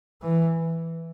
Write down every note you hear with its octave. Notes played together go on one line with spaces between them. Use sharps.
E3